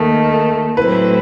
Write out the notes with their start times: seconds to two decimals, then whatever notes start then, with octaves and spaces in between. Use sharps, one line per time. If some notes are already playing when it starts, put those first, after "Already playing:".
Already playing: D#2 D#3 A3 D#5
0.77 A2 F#3 A3 C4 E4 B4